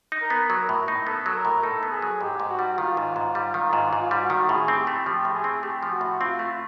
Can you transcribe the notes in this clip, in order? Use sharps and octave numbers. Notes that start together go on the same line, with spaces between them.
D#4
A#4
B3
F#3 A#4
A2
D#4
B3 A4
F#3
A#4
A2
D#4 A4
B3
G#4
F#3
G#2 G4
G#2
F#4
G3
D#3 F4
G#2
G#2
G3
D#3
G#2
G#2 F4
G3
F#4
D#3
A2 G#4
C4
G4
A3
F3 G4
A2
G#4
C4
A3 G4
F3
F#4
A2
C4 F4
A3